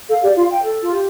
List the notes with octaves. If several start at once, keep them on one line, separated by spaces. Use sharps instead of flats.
A4 F5
G4 D5
F4 F5
G5
A4
F4
G4